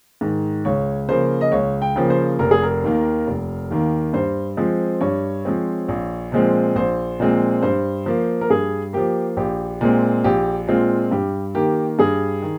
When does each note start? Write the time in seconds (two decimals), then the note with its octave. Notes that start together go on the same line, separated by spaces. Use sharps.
0.21 G#2 D#3
0.65 C#2 C#5
1.09 C#3 F3 A#3 C5
1.41 D#5
1.52 C#2 C#5
1.82 G5
1.96 C#3 F3 A#3
2.10 C5
2.39 F1 A#4
2.51 G#4
2.63 A#4
2.83 D#2 D#3 A#3
3.27 F1
3.70 D#2 D#3 A#3
4.14 G2 C5
4.57 F3 G#3 C4
5.01 G2 C#5
5.45 F3 G#3 C4
5.88 A#1
6.32 A#2 F3 G#3 C4
6.75 A#1 C5
7.20 A#2 F3 G#3 C4
7.62 G2 C5
8.06 F3 A#3
8.41 A#4
8.50 G2 G#4
8.93 F3 A#3 G4
9.37 A#1 G4
9.81 A#2 G#3 C4
10.24 A#1 G4
10.68 A#2 G#3 C4 F4
11.12 G2 G4
11.55 D#3 A#3 G4
11.99 G2 G#4
12.42 D#3